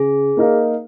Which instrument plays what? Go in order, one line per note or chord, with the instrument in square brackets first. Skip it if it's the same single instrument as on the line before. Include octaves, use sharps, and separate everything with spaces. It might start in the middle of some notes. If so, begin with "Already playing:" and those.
Already playing: [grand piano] C#3 [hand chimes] G#4
[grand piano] A#3 D#4 A#4 F5